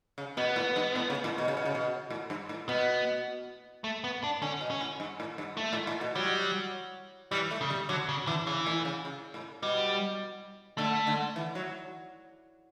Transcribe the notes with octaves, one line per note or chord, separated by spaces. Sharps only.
C#3
B2 B3
A2
G2
A2
C#3
A2
B2
C#3
B2
C#3
B2
A2
G2
A2
B2 B3
A3
B3
D4
D3 C#4
B2
C#4
A2
G2
A2
G2
A3
A2
A2
B2
F#3 G3
E3 G3
A3
C#3
G3
D3 F#3
C#3
D3 E3
C#3 E3
A2
C#3
C#3
A2
B2 G3
D3 A3
D3
E3
F#3